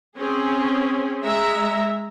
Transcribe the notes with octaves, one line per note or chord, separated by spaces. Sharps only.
C4 C#4 G#4
G#3 E5 A#5